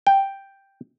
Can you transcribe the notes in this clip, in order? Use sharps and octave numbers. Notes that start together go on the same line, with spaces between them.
G5